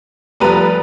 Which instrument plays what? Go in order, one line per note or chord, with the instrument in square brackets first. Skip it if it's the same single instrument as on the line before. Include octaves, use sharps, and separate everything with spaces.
[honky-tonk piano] F1 B4 A#5 [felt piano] F3 G3